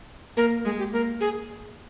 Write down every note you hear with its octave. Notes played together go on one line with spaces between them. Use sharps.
A#3 A#4
G#3 G#4
G4
A#3 A#4
G#4